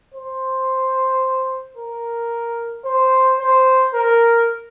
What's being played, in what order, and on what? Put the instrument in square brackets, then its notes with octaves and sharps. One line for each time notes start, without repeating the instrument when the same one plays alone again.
[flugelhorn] C5
A#4
C5
C5
A#4